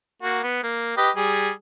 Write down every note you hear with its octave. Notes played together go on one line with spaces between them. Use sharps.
A#3 F#4
B3
A#3
G4 B4 D#5
G3 G#4